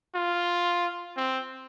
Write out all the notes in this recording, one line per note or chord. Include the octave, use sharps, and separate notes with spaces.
F4
C4